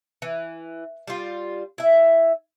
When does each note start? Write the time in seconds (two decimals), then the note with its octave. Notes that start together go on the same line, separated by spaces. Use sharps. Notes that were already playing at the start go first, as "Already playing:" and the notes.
0.22 E3
1.07 G3 F4
1.78 E4 E5